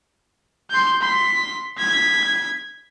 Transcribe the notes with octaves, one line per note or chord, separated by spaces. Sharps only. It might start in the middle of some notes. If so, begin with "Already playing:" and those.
C6 G6
C6 B6
G#6 B6